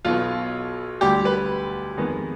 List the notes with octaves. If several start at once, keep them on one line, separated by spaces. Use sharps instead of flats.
B1 B2 B3 F4
D2 D3 G3 G4
B4
F2 D#3 G#3 B3